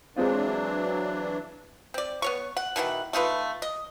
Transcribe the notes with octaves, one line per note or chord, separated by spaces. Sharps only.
E3 F#3 G#3 C4 D4 F4
C4 D5
B3 C#5 C#6
F#5
B2 D#3 E3 F#5
A3 D#4 F4 B4
D#5